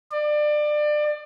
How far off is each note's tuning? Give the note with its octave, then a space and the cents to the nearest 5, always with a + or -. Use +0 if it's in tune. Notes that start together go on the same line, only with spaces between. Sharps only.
D5 +25